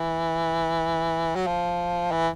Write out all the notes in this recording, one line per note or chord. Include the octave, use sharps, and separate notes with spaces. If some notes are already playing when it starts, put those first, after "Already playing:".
Already playing: E3
F#3
F3
E3